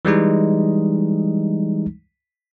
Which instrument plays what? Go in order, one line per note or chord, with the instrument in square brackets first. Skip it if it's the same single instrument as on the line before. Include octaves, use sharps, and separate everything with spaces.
[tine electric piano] E3 G3 G#3 D#4